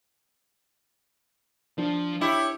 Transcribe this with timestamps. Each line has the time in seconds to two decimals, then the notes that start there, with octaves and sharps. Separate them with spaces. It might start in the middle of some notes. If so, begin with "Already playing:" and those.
1.78 F3 D4
2.21 E4 G4 C#5